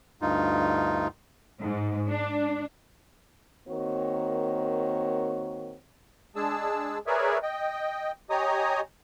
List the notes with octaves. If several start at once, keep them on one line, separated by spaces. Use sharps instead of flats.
D2 G2 D#4 F4
G#2
D4
D#3 A#3 C4 F#4 C#5
G#3 D4 G#4 A5 E6
G#4 A#4 B4 C#5 D5 E5
D#5 G5
G4 C#5 D#5 G#5 A#5 D#6